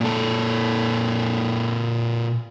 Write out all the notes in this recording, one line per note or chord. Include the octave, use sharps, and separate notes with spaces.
A#2 A4